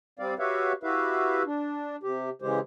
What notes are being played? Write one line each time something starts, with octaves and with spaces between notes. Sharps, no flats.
G3 C4 D5 F5
F#4 G4 B4 C#5 E5 F5
E4 F#4 G4 B4 E5 F5
D4
C3 G4
C#3 E3 G#3 G4 C5